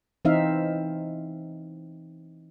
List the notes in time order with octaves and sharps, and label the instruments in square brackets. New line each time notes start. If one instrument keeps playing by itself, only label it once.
[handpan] E3 C4 D#4 E5 F5